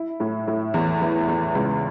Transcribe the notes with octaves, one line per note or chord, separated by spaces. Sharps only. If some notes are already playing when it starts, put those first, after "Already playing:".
Already playing: E4
A2
A2
E2
E3
E2
C#2